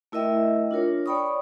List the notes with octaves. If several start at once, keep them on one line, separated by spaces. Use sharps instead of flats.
A3 E4 A#4 D#5 E5 G5
D4 F4 A#4 C#5
C#5 D5 G5 B5 C#6 D#6